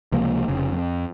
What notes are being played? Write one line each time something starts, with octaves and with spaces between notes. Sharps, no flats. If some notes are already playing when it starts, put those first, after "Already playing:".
C#2 C3 F3 A#3
F1 C#3
F2